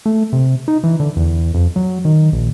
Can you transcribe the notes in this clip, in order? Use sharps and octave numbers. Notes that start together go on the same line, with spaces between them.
A3
C3
D#4
E3
D3
E2
F2
F#3
D#3
A#1